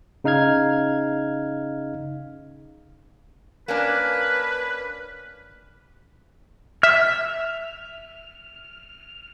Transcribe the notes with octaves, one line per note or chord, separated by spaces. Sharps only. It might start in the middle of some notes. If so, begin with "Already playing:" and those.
C#3 D#4 F5 F6 G#6
A#3 C#4 D4 B4
E5 F6